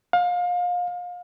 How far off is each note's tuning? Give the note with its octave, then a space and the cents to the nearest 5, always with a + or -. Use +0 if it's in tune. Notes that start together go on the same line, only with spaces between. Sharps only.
F5 +30